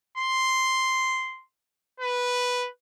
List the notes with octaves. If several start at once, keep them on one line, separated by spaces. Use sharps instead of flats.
C6
B4